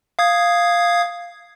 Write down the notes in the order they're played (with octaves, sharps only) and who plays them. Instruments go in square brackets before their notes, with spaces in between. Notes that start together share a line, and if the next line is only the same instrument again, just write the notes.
[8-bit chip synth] F5 D#6 G#6